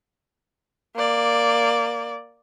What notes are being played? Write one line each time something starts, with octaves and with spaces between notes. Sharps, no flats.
A#3 D5